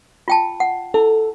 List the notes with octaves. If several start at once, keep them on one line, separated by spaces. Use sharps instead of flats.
F4 G5 A5
F#5
E4 A4